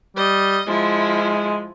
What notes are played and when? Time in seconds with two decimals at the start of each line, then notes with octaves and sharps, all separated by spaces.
0.17 G3 D#5
0.67 F3 G#3 E4